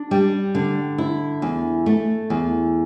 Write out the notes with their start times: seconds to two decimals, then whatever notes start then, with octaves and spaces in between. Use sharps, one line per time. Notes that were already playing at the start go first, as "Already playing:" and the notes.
Already playing: D4
0.11 G3
0.55 D3
0.98 E4
1.42 E2
1.86 A3
2.30 E2